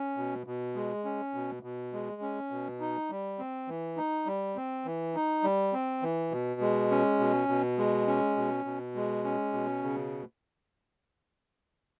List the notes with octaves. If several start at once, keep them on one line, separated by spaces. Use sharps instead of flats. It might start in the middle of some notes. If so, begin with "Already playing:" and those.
Already playing: C#4
B2
B2
G#3
C#4
B2
B2
G#3
C#4
B2
D#4
G3
C4
E3
D#4
G3
C4
E3
D#4
G3
C4
E3
B2
G#3
C#4
B2
B2
G#3
C#4
B2
B2
G#3
C#4
B2
C#3